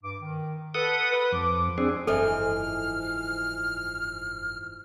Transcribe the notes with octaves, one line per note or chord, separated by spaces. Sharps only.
G2 D6
D#3
A4 B4 F#5 D#6
B4
F2 F3 D6
C4 D4 G#4
F#1 G#2 E3 F3 A4 F6